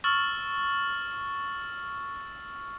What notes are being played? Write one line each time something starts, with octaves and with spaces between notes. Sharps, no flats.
C#6 E6 F6 A6 F#7